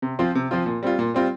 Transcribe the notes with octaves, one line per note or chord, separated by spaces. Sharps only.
C3
F3 C4 F4
C3
F3 C4 F4
A#2
G3 C4 F4
A#2
G3 C4 F4